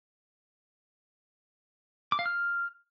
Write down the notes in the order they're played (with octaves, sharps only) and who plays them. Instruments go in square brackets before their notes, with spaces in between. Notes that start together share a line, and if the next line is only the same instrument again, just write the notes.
[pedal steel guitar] D6
F5
F6